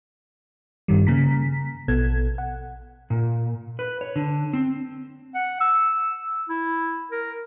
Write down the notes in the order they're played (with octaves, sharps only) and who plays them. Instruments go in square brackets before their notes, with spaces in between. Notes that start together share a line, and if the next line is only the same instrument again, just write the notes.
[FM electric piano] G2 D#3 G3
C#3 A#3 A#5 B6
A#1 B2 B3 A4 G#6
F#5
[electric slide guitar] A#2
B4
C#5
D3
C4
[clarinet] F#5
E6
E4
A#4